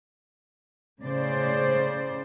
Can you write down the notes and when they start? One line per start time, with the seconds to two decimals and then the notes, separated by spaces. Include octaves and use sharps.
1.02 A2 C#3 C5 D5